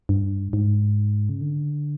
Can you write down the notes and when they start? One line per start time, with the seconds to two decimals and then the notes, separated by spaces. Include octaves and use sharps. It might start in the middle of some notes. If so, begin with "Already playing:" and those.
0.09 G2
0.53 G#2
1.29 C#3
1.41 D3